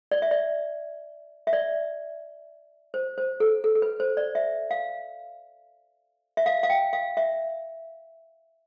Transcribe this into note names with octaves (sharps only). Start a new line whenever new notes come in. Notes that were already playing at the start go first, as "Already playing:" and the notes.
D5
E5
D5
E5
D5
C5
C5
A4
A4
A4
B4
C5
D5
E5
F5
E5
F5
F5
G5
F5
E5